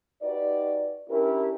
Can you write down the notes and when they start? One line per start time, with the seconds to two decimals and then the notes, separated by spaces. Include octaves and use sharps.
0.22 D#4 F#4 G4 B4 D5
1.10 C#4 D4 E4 G4 A#4